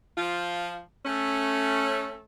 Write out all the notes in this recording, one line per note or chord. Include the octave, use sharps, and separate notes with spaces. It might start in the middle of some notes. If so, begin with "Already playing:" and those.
F3 F4
A3 C#4